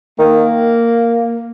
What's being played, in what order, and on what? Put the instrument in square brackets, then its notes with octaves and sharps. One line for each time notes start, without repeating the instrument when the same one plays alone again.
[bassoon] D#3 [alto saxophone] A#3